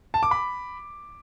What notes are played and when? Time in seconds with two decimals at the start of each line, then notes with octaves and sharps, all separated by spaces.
0.14 A5
0.23 D6
0.31 B5